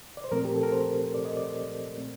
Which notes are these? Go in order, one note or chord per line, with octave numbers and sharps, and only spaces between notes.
D5
C5
A#2 F3 A3 C4 A#4
G4
A4
A#4
C5
D5
D#5
D5
A#2 A3 C4